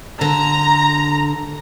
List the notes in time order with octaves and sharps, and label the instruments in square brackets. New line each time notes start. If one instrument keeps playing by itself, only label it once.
[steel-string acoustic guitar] D3 [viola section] A#5